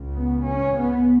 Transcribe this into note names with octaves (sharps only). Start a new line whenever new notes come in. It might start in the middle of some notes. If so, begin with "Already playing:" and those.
Already playing: C#2 C#3
B3
C#4
B3